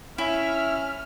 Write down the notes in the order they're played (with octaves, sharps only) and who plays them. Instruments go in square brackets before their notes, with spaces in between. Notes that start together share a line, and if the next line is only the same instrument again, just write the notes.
[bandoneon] C#4 [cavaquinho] E4 [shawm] E5 [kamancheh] F6